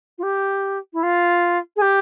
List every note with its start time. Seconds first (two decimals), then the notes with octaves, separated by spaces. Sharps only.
0.18 F4
0.23 G4
0.93 E4
1.03 F4
1.76 G#4
1.81 G4